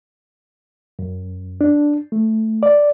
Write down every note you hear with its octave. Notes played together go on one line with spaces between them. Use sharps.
F#2
D4
A3
D5